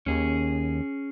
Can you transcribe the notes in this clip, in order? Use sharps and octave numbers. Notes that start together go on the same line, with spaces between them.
D#2 C#4 G#4